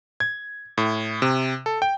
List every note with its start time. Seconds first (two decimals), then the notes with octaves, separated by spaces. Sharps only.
0.20 G#6
0.78 A2
1.22 C3
1.66 A4
1.82 G5